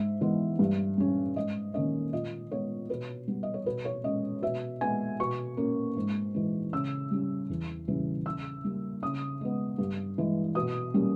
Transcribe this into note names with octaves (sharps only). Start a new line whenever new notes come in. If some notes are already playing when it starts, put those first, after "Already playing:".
Already playing: G#2 E5
E3 G#3 B3
G2
G3 C#4
G#2 D#5
D#3 A#3 C#4 D#5
A#2 D#5
G#3 B3 C#5
B2 B4
G3 B3
D#5
C#5
B2 B4
C#5
G#3 C#4 D#5
B2 E5
G#3 B3 G#5
B2 C#6
A#3 C#4
G#2
E3 G#3
C#3 E6
G3 C#4
E2
C#3 E3 G3
C#3 E6
G3 A#3
C#3 D#6
G#3 B3
G2
E3 G#3
B2 D#6
G3 A#3 C#4